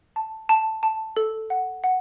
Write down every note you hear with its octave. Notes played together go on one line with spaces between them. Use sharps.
A5
A5
A5
A4
F#5
F#5